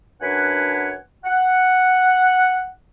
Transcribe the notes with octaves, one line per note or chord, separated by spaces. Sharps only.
F#2 D4 B4 C#5 F#5 G#5
F#5